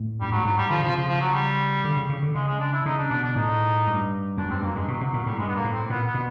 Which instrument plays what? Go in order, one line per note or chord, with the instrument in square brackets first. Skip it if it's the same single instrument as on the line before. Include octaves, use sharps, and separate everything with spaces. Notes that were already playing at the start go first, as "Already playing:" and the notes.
Already playing: [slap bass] A2
[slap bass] G2 [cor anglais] G3
[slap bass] G#2 [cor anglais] F#3
[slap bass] G#2 [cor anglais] F#3
[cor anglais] G3
[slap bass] D3 [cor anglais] F3
[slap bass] C#3
[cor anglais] F3
[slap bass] C3
[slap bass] C#3 [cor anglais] F3
[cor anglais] F3
F#3
G3
[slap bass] D3
C#3
C#3
D3
[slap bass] C#3 [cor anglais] G#3
[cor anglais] G#3
D4
E4
[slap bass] C#3 [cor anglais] D#4
[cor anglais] D4
[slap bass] B2 [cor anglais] D4
[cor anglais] D4
[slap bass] A2 [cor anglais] D#4
[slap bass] G2
[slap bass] F#2 [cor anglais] D4
[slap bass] G2 [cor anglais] C4
[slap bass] F#2 [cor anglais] A#3
[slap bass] G2 [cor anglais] G#3
[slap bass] B2 [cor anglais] F#3
[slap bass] C3 [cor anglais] F#3
[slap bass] A#2 [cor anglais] F#3
[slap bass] A2 [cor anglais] G3
[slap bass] G2 [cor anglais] G#3
[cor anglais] B3
A#3
[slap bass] A2
[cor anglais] C4
[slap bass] A#2 [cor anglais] B3
[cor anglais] B3
[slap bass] B2